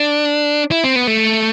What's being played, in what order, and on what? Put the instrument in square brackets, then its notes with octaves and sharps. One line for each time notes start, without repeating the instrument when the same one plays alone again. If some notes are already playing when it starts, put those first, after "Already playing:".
Already playing: [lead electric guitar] D4
E4
C4
B3
A3